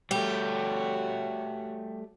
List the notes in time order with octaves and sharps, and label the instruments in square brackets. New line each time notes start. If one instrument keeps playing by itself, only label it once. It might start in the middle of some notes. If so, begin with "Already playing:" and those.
[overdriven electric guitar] G3 A3 [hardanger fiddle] F#4 C#5 [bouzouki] G4